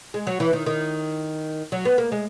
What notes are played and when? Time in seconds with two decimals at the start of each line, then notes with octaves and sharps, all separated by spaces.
0.14 G#3
0.27 F#3
0.40 E3
0.53 D#3
0.66 D#3
1.72 F#3
1.85 B3
1.98 A#3
2.12 G#3